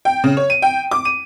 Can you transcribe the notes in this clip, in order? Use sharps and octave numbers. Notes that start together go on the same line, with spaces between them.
G5
C#3
C#5
D#7
G5
D6
D#7